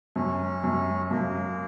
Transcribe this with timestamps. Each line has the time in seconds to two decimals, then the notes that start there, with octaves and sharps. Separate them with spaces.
0.16 F#2 C#4
0.64 F#2
1.11 F#2 A#3